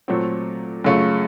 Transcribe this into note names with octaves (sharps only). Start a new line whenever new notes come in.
A#2 F#3 A3 C4
F#2 C#3 A3 C#4 F4